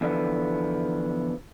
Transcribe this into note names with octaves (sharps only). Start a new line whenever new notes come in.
E2 D3 F3 B3